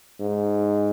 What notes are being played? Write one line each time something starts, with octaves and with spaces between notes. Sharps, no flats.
G#2